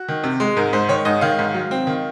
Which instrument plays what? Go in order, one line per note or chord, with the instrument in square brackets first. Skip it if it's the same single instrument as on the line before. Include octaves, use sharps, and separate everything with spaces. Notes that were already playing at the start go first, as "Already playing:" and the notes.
Already playing: [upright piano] F#4
D#3
C3
G#3
G#2 A#4
G#2 C5
D#3 C#5
G#2 D#5
D#3 F5
G#2
F#3
C4
D#3